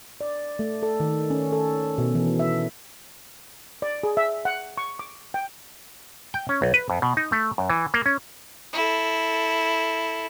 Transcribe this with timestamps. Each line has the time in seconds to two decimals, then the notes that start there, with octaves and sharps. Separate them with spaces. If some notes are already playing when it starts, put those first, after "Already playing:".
0.21 D5
0.59 A3
0.83 A4
1.00 D#3
1.30 C#4
1.52 A4
1.98 B2
2.15 E3
2.39 E5
3.82 D5
4.03 G#4
4.17 E5
4.45 F#5
4.78 C#6
4.99 D6
5.34 G5
6.34 G5
6.49 C#4
6.62 B1
6.74 B4
6.90 F2
7.02 B2
7.17 D#4
7.32 A3
7.58 F#2
7.70 E3
7.94 A#3
8.06 C#4
8.73 E4 A4